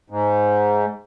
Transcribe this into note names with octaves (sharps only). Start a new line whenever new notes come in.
G#2